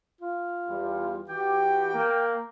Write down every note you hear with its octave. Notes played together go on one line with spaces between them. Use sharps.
F4
E2 G3
E3 F#4 G4 G5
A#3